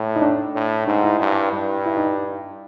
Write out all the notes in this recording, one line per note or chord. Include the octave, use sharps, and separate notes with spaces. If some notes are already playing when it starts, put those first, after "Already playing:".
Already playing: A2
D#4
D4
A2
G#2 D#4
E4
G2
G2
E4
D#4